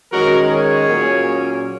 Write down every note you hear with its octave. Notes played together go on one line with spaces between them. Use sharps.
D#3 G#3 C#4 F#4 A#4
G#4 C#5
A#2 F#3 A#3 C#4